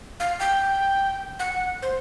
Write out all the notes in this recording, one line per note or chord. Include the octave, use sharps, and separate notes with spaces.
F5
G5
F#5
C5